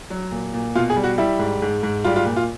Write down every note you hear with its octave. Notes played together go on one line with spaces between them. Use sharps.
F#3
A#2
A#2
B2 F4
G#4
G3
F#4
G3 E4
G#2
G#2
G#2
G3 F4
F4
A#2
F4